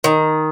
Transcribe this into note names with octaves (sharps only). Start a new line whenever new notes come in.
D#3